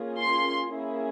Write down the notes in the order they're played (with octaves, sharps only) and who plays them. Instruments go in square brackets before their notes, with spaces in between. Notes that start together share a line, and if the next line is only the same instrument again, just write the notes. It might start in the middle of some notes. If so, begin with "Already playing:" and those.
Already playing: [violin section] A#3 C#4 F4 G#4
C6
A#3 C#4 E4 G#4